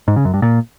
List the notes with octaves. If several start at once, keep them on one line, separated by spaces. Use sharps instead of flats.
G#2
C#3
F#2
G2
A#2